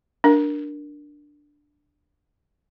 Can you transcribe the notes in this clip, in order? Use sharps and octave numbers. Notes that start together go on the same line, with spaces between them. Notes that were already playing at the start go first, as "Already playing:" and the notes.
D4 A#4